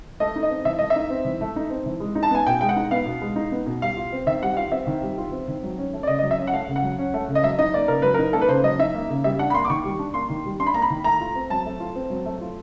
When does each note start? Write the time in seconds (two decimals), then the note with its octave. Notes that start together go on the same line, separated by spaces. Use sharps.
0.20 A3 D#5
0.36 D#4
0.43 D#5
0.50 C4
0.65 E3 E5
0.79 A3 D#5
0.90 E5
0.96 D#4
1.10 C4
1.25 E3
1.41 A3
1.56 D#4
1.70 C4
1.86 E3
2.00 G#3
2.15 D#4
2.23 A5
2.31 B3 G#5
2.47 B2 G5
2.61 G#3 G5
2.69 F#5
2.76 D#4
2.91 B3 F5
3.06 B2
3.22 G#3
3.36 D#4
3.52 B3
3.66 B2
3.81 G3 F5
3.97 F4
4.12 C4
4.26 D#3 E5
4.42 G3 F#5
4.57 F4 F5
4.72 C4 E5
4.87 D#3
5.02 G3
5.18 F4
5.32 C4
5.48 D#3
5.63 F#3
5.78 C#4
5.93 A3
6.03 D5
6.07 C#3 D#5
6.19 F#3 D#5
6.31 E5
6.38 C#4
6.47 F#5
6.53 A3 F5
6.68 C#3
6.76 F#5
6.82 F#3
6.98 C#4
7.14 A3
7.28 C#3
7.35 D#5
7.43 F#3 E5
7.59 D#4 D#5
7.74 A#3 D5
7.88 C#3 A#4
8.02 F#3 B4
8.14 D#4 A#4
8.33 A#3 A4
8.41 B4
8.48 C#3 C5
8.63 F#3 D#5
8.79 D#4 E5
8.95 A#3
9.10 C#3
9.24 G3 E5
9.39 D4 F#5
9.50 B5
9.54 A#3 C6
9.65 D6
9.70 D#3 C#6
9.84 G3
9.99 D4
10.14 A#3 C6
10.30 D#3
10.45 G3
10.60 D4 C6
10.67 B5
10.74 A#3 A#5
10.82 B5
10.90 D#3
11.04 A3 A#5
11.20 F4
11.36 C4
11.50 F#3 A5
11.66 A3
11.80 F4
11.96 C4
12.10 F#3
12.26 A3
12.41 F4